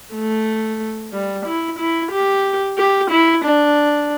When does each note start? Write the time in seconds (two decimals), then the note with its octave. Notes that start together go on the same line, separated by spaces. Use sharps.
0.14 A3
1.13 G3
1.46 E4
1.79 E4
2.12 G4
2.78 G4
3.11 E4
3.44 D4